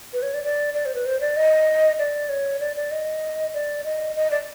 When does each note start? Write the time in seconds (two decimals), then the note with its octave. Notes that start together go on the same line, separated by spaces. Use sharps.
0.13 B4
0.22 C#5
0.34 D5
0.44 D5
0.74 D5
0.86 C5
0.95 B4
1.06 C5
1.21 D5
1.37 D#5
1.99 D5
2.29 C#5
2.60 D5
2.76 D5
2.91 D#5
3.54 D5
3.85 D#5
4.16 D#5
4.31 D5